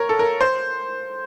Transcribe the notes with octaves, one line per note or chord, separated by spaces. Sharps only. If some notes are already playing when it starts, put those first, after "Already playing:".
Already playing: A#4 C#5
A4
A#4
C5